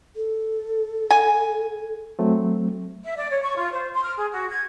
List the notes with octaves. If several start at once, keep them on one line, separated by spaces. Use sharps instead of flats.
A4
G#5
F#3 A3 C4
E5
D5
C#5
C#6
F4
C5
C6
F6
G#4
F#4
G#6